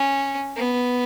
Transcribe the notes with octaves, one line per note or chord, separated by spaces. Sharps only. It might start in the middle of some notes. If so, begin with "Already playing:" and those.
Already playing: C#4
B3